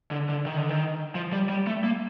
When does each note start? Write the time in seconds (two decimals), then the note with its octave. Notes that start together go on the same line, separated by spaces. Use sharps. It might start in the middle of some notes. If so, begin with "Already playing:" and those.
0.11 D3
0.29 D3
0.46 D#3
0.57 D3
0.69 D#3
1.15 F3
1.32 G3
1.49 G3
1.67 A3
1.84 A#3